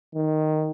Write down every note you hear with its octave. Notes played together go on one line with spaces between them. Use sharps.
D#3